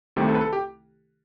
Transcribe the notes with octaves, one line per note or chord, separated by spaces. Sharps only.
C2 C3 D#3 A3 G4
A4
B4
A4
G4